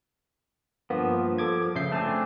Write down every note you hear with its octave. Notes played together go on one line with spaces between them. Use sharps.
G2 F3 A#3 B3
A4 D6 G#6
C#3 E5 G6 C7
A3 C4 D4 G#5 A5